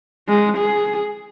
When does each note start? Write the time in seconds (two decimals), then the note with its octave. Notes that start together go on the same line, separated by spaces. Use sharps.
0.29 G#3
0.58 G#4